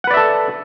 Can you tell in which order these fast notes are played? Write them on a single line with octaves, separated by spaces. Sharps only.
F#5 B4 D5 E5 A4